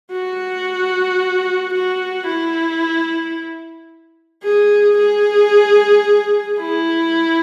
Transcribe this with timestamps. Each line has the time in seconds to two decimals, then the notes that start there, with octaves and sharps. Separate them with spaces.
0.12 F#4
1.74 F#4
2.27 E4
4.43 G#4
4.98 G#4
6.60 E4